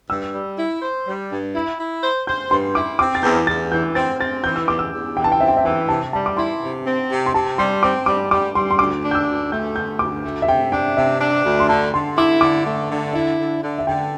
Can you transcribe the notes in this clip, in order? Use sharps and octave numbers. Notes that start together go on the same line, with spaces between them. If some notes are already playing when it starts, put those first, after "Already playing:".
G2 E6
G3
E4
C5
G3
G2
E4
E4
C5
C5 G6
G2 C6
E4 D6
C4 D6
A6
E2 G6
E2 A6
E3 G6
C4 A6
C4 A6
E3 G6
E6
E2 D6
E6
E2
E3 G5
A5
G5
C4 E5
G5
E5
E3 G5
C3 A5
G3 A5
D6
E4 C6
C3
C4
C3
C6
C3 A5
G3 C6
C4 D6
G3 D6
G3 D6
G3 C6
C6
D2 D6
D4
G6
E6
D2
A3 G6
D2 G6
D2 D6
A3
E5
C3 G5
D4 G5
C3 E5
D4
D2
C6
D3 A5
D3 C6
E4 D6
D3 D6
A3
D3
E4 E5
D3
D3
E5
D3 G5